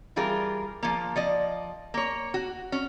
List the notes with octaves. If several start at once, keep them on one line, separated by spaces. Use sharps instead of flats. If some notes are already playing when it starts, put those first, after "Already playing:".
E3 G3 F4 G#4 A#4
F3 A#3
F3 D5 D#5
A#3 C#5
F#4
C#4